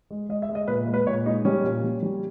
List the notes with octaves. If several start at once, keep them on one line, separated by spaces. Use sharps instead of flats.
G#3
G#3 D#5
E5
G#3
D#5
A#2 B4
G#3
B4
A#2 C#5
G#3 D#4
G3 C#4
A#2
G3
G3